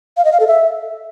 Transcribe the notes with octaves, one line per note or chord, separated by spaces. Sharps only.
F5
D#5
F5
A4
E5